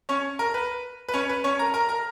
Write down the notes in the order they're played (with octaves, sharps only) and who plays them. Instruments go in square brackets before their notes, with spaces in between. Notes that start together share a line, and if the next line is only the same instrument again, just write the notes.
[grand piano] C#4 C#5
A#4
B4
B4
C#4 C#5
B4
C#4 C#5
A#4 A#5
A#4 A#5
A#4 A#5